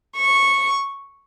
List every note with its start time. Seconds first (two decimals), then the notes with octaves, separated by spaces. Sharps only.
0.17 C#6